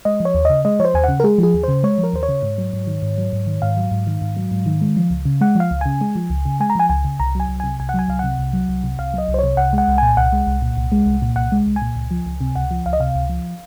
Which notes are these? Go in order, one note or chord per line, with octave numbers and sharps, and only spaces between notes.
G#3 D#5
F3
C#5
D#2
C#3 D#5
G#3 D#5
F3 C5 C#5
D#2 G#5
C#3 F#5
A#4
G#3 G#4
F3 G#4
D#2
C#3 C5
G#3 C#5
F3
A#4
D#2 C5
C#5
C#3
G#2
F#3
G#2
D#3
G#2
F#3
G#2
D#3
G#2 F5
F#3
G#2
D#3
G#2
F#3
G#2
D#3
G#3
F3
C#2
C#3
G#3 F#5
F3 F5
C#2
C#3 G#5
G#3
F3
C#2
C#3
G#3 G#5
A#5
F3 G#5
C#2 G#5
C#3
C2 A#5
F#3 G#5
C2
C3 G#5
C2 G#5
F#5
F#3 G#5
C2 F5
C3 F#5
C2
F#3
C2
C3
C2 F5
F#3 D#5
C2
C5
C3 C#5
C2 F#5
G#3 F#5
C2
A#2 G#5
C2 F#5
G#3
C2
A#2
C2
G#3
C2
A#2
C2 F#5
G#3
C2
G#5
A#2
C#2
F3
C#2
C3
C#2 F#5
F3
C#2 F5
D#5
C3 F5
C#2
F3